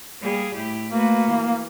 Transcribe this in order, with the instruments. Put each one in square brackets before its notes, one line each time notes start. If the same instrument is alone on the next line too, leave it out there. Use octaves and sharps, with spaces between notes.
[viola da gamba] G3 A#3 G#4
A2 E4 G4
[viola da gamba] A3 F#4 B4 [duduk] A#3
[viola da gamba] E3